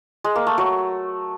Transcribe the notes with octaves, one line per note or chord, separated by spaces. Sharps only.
G#3
A#3
A3
F#3